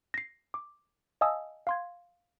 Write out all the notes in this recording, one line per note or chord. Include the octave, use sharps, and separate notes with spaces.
A#6 C7
D6
D#5 F5 G#5 A5 D#6 E6
F5 C6 G#6